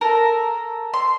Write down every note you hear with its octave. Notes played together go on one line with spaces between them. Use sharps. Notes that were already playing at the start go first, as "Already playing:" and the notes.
A4 A#4
C6